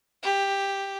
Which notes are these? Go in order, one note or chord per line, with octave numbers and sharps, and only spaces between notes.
G4